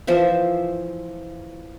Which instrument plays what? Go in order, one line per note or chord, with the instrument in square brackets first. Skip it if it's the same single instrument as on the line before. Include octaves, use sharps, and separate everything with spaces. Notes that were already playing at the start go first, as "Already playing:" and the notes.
[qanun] E3 F3 C5 E5